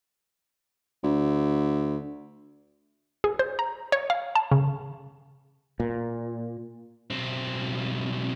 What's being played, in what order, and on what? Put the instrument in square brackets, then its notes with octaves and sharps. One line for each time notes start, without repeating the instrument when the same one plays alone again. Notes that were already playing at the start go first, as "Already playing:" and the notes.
[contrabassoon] D2
[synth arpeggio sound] G#4
C5
A#5
C#5
F5
A5
C#3
[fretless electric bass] A#2
[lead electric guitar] B1 C4